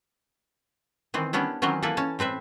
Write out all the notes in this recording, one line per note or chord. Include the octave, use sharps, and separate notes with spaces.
D#3 E3 C4
G3 B3 C#4 D4 E4
D#3 E3 F#3 C4 C#4
E3 A#3 E4 A4 B4
C#4 A5
A2 C4 B4 E5